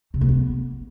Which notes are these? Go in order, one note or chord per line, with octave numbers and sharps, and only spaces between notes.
C3
A3
B3